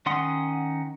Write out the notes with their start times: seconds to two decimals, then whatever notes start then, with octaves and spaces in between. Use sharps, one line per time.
0.06 D#3 C#4 F#5 C6 D#6